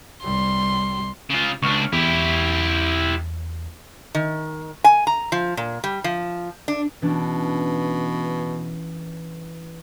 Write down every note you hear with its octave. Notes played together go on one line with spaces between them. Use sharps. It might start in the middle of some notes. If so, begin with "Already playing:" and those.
C2 G3 C6
C#3 F4
C#2 D4 C#6 F6
E2 E4 G4
D#3
G#5
A#5
F3
A#2
G3
F3
D4
B2 E3 C#4 D4